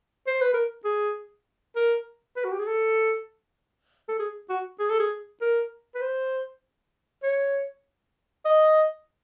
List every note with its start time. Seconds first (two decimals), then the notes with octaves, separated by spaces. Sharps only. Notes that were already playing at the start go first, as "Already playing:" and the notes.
0.27 C5
0.41 B4
0.54 A#4
0.85 G#4
1.76 A#4
2.36 B4
2.44 F#4
2.52 G4
2.59 G#4
2.67 A4
4.09 A4
4.19 G#4
4.49 F#4
4.80 G#4
4.90 A4
5.00 G#4
5.41 A#4
5.95 B4
6.01 C5
7.23 C#5
8.45 D#5